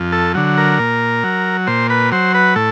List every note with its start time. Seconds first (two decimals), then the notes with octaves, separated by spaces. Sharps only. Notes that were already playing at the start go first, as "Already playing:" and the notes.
Already playing: F2
0.12 A4
0.35 D3 F#3
0.58 A#4
0.79 A#2
1.24 F#3
1.67 A#2 C5
1.90 B4
2.12 F#3 C5
2.34 B4
2.56 A2 A4